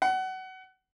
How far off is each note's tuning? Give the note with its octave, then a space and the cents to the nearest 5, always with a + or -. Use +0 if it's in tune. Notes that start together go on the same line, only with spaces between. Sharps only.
F#5 +25